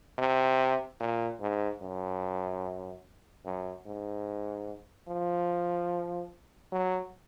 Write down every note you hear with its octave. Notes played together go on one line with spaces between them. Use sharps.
C3
A#2
G#2
F#2
F#2
G#2
F3
F#3